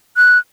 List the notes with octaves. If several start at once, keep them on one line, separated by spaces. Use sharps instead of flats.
F#6